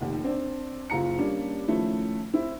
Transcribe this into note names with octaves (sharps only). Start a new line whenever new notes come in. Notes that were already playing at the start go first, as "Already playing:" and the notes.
F1 D#2
C4 D4
F#1 F4 A#5 C#7
G3 A#3 C#4 D4
D#3 F3 A3 C#4 E4
C4 E4